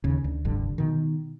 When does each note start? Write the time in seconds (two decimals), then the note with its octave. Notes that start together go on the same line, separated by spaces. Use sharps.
0.04 D#2 C#3
0.24 D2
0.45 F1 C2 G2 D3
0.78 B2 D#3